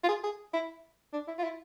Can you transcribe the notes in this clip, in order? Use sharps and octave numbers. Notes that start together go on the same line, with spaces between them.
F4
G#4
G#4
E4
D4
E4
F4
E4